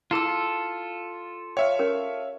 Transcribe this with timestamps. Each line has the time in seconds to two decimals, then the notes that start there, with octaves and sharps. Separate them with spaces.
0.11 E4 F4 G#4 A4 E6
1.57 C#5 E5 F5 G5
1.79 C#4 G4 A#4